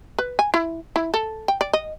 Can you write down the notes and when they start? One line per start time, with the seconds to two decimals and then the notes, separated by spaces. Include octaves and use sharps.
0.19 B4
0.39 G#5
0.54 E4
0.96 E4
1.14 A4
1.48 G5
1.61 D5
1.73 D#5